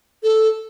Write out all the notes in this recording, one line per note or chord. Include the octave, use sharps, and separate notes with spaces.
A4